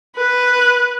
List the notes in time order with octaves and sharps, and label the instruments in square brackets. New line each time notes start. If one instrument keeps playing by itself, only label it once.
[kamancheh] B4